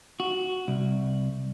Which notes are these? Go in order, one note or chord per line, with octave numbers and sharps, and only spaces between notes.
F#4
C2